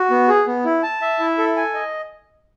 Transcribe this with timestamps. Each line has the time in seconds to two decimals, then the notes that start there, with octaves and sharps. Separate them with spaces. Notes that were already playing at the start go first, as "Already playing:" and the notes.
Already playing: F#4
0.10 B3
0.28 G#4
0.47 B3
0.65 E4
0.83 A5
1.02 E5
1.20 E4
1.38 A4
1.56 G#5
1.74 D#5